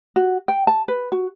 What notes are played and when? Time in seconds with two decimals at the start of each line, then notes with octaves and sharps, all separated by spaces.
0.16 F#4
0.48 G5
0.67 A5
0.88 B4
1.12 F#4